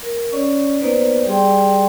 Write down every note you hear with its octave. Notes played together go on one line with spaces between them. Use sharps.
A#4
C#4 C#5 D5 C#6
A#3 B3 D#4 B4 C5 D5
G3 G4 G#4 D5 G5 C6